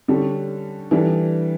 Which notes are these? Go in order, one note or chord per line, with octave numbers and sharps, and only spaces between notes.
D3 G3 C#4 F#4 A4
E3 G3 D4 A4